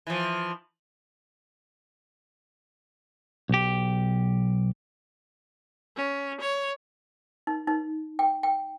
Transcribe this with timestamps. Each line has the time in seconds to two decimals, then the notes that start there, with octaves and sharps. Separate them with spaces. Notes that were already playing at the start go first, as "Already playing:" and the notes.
0.07 E3 F3
3.49 B1 G4
5.97 C#4
6.41 C#5
7.47 D#4
7.67 D#4
8.19 G5
8.43 G5